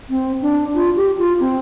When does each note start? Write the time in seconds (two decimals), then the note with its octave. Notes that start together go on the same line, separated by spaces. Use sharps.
0.10 C4
0.42 D4
0.75 F4
0.96 G4
1.18 F4
1.40 C4